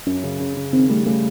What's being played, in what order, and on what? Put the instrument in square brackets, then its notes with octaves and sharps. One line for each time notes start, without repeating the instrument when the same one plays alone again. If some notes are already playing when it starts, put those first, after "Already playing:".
[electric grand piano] F#2 [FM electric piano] C#4
[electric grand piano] C#3
C#3
C#3
[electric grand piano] D#3 [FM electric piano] C4
[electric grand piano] G3 [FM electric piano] A3
[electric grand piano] C#3 [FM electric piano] A3